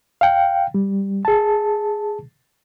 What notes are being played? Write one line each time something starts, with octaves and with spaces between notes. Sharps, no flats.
F5 G5
G3
G#4 A5